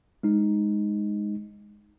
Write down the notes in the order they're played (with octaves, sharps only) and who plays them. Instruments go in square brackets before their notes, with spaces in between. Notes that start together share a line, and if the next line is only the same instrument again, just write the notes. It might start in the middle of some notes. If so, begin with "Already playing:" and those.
[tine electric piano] G#3 D#4